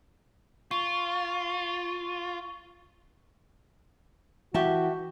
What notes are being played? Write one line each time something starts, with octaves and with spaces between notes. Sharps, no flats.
F4 C#6
E3 F#4 G4 E5 A5